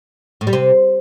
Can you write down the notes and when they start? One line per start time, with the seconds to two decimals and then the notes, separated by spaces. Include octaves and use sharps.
0.41 A2
0.47 G3
0.53 C3